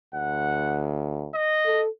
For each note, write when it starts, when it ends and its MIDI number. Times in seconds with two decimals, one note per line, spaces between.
0.14 1.30 38
0.14 0.88 78
1.34 1.81 75
1.66 1.89 69